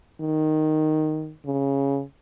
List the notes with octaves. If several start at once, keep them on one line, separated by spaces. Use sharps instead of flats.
D#3
C#3